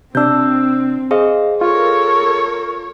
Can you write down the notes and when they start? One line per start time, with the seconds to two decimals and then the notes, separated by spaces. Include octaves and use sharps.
0.15 C3 C4 D4 E6 G6
1.11 G#4 C5 D#5 F5
1.61 F4 A4 A#4 C#5